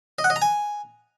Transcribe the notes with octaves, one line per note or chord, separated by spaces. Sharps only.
D#5
F#5
D#5
A#5
G#5